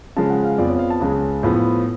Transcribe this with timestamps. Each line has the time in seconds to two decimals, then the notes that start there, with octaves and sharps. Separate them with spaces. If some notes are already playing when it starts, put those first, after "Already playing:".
0.17 C#3 F3 G#3 C#4 A5
0.30 F#5
0.45 F5
0.58 F2 F3 B3 D5
0.69 C#5
0.79 F5
0.90 A5
1.00 C#2 C#3 G#3
1.43 A2 F3 B3